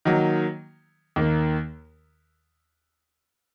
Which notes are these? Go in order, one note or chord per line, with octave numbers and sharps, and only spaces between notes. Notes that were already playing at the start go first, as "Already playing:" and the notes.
D#3 F#3 A#3
D#2 D#3 A#3